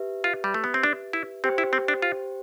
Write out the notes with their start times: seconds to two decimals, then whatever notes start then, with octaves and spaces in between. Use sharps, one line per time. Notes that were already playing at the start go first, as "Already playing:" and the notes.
Already playing: G4 B4 E5
0.24 F4
0.44 G3
0.54 A3
0.64 B3
0.74 C4
0.83 D4
1.13 E4
1.44 C4 G4 C5 G5
1.58 E4
1.73 C4
1.88 D4
2.02 F4